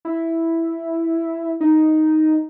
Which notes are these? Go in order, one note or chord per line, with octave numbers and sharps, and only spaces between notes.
E4
D#4